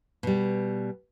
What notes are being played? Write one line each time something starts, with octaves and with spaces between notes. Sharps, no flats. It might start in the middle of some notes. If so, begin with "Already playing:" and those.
B2 G3